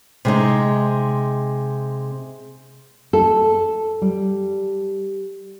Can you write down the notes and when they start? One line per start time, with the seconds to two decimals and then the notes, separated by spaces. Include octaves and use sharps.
0.25 C3 G#3 D#4
3.13 A4
4.02 G3